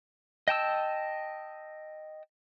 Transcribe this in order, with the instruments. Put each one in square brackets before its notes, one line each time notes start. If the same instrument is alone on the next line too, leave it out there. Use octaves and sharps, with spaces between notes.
[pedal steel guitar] D#5 G5 A5 E6